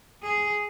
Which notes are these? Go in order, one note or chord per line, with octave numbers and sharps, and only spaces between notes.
G#4